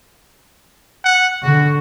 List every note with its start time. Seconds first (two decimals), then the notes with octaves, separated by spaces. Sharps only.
1.05 F#5
1.43 D3 F#4